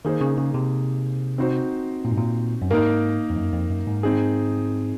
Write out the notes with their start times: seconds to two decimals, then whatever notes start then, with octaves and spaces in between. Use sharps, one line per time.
0.05 D#3 A#3 D#4 G#4 C5
0.21 C#3
0.38 C#3
0.54 C3
1.38 C4 D#4 F#4 C5
2.05 A#2
2.12 G#2
2.18 A#2
2.62 F#2
2.70 G#2 A#3 D#4 A#4
3.30 F2
3.37 F#2
3.53 F2
3.70 F#2
3.87 G#2
4.03 C4 D#4 G#4